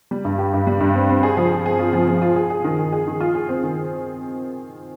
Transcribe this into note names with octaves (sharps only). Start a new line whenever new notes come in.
G3
G2
G4
G2
G3
G2
C4
C4
G#4
F3
G#4
G#4
F4
F3
F3
F4
G#4
G#4
D#3
D#3
G#4
D#3
F4
G#4
C4
D#3